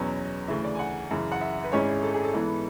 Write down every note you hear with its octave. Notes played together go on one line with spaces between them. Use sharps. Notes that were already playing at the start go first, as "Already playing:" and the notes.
Already playing: E2 B2 F#3 C#4
D2 C#3 E3 E5
D5
G#5
F#5
F#2 C#3 E3
F#5
E5
B4
G#1 G#2 G#3 C#4 E4 C#5
A4
G#4
A4
G#2 E3 B3 E4